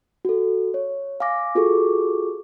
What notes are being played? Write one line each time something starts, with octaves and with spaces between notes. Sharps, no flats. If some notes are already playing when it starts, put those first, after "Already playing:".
F#4 A4
C#5
F5 G#5 D6 A#6
F4 F#4 G#4 A4 C#6 D6